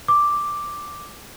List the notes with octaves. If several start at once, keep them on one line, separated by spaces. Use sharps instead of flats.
D6